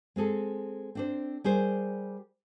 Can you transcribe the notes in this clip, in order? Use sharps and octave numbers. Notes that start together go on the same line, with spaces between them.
G#3 C4 G#4 A4
C4 D4 C5
G3 G4 G#4 A#4 C5